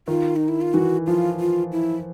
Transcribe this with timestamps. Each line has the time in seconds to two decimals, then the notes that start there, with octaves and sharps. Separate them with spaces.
0.08 D#3 F4
0.36 D#4
0.48 E4
0.61 F4
0.74 E3 F#4
1.07 F3 F4
1.40 F4
1.72 E4